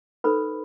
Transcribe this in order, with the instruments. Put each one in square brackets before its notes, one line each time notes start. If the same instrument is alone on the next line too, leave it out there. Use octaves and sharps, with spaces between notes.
[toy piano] D#4 A4 B4 C5 B5